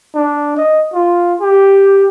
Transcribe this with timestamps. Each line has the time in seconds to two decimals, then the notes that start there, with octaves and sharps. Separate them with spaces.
0.15 D4
0.57 D#5
0.93 F4
1.41 G4